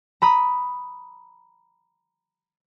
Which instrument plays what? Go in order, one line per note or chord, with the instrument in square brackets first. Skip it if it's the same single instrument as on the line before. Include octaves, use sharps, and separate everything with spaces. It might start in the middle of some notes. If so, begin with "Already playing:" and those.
[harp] A#5 B5 D#6